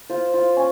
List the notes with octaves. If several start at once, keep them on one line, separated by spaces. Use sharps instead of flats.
F4 C5
F4
C#4